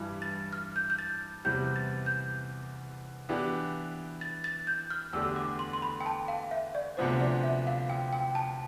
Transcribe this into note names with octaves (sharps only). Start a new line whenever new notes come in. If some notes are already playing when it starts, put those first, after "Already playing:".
Already playing: G2 E3 G3
A6
F6
G6
G6
A6
E2 C3 E3 G3 G6
A6
G6
E3 B3 D4 G4
A6
A6
G6
F6
E2 D3 A3 D4 G4 E6
D6
C6
C6
B5
G5
A5
F5
E5
D5
D2 C3 F3 B3 D4 C5
D5
E5
F5
G5
G5
A5